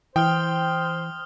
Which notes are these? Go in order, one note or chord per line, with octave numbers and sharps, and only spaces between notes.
E3 C5 G5 D#6 F6 G7